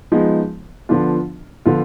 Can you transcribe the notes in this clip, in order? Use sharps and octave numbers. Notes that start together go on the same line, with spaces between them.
F3 G#3 B3 D#4
D3 F3 B3 D4 F4
D3 F3 B3 F4